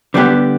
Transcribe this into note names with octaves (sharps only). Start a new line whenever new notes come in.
D3 G3 B3 D4 G4